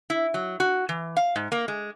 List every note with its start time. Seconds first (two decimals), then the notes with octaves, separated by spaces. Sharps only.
0.10 E4
0.34 F#3
0.60 F#4
0.89 E3
1.17 F5
1.36 G#2
1.52 A#3
1.68 G#3